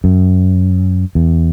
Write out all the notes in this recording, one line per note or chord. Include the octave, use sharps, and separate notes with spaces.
F#2
E2